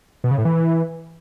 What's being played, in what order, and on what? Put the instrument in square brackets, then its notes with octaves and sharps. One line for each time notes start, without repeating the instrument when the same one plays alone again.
[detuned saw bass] B2
C#3
A2
E3